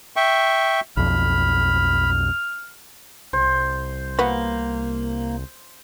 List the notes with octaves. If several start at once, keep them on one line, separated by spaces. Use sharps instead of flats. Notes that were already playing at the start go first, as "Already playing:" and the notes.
E5 G5 C#6
B1 F2 B5 F6
C2 C5
A#3 B3 F#4